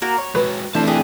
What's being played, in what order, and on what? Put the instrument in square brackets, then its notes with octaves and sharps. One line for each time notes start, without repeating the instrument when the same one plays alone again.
[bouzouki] A#3 F#4 A#4
C#5
[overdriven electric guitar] G#3 F#4 [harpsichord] B4
[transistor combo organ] E3 A3 D4 [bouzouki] F3 E5 [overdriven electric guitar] C4 A5
[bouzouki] G4 G#4